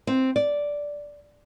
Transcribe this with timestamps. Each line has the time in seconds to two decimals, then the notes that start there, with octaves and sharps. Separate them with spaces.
0.07 C4
0.36 D5